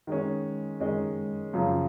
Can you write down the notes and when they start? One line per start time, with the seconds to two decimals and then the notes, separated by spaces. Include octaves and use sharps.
0.07 D#3 G#3 C#4
0.80 D#3 G#3 C#4
1.53 F#2 C#3 F3